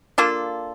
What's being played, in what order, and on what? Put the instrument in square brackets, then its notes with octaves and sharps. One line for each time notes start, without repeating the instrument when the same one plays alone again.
[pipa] A#3 D4 F4 A4